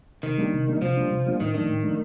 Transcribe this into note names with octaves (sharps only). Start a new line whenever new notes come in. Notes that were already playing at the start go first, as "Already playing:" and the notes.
C3 D#3
G3 A#3 D4
C3
G3 A#3 D4
C3 F3
G3 A#3 D4
C3
G3 A#3 D4
A2 D#3
D#3 F3 A3 D4
A2
F3 A3 D4